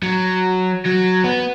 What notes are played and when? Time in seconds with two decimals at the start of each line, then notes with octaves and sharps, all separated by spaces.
0.03 F#3
0.85 F#3
1.24 B3